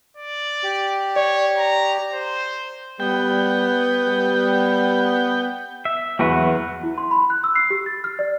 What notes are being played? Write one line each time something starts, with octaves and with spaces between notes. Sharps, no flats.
D5
G4
C#5 D5
A#5
C5
G3 B3 G5
G3
E5
E2 F#3 F#4 B4
E4
C6
B5
F#6
E6
C7
G4
A6
F6
D5